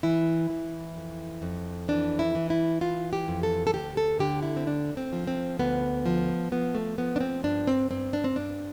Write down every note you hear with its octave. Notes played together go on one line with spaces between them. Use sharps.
E3 E4
E3
F2
F2
E3 D4
E4
E3
E4
E3 F4
G4
F2
A4
A4
D2 G4
A4
D3 G4
E4
C4
D2 D4
C4
F3
C4
D2 B3
F3
F3 B3
A3
F3 B3
D4
C4
G2 D4
C4
G2 C4
D4
C4
G2 D4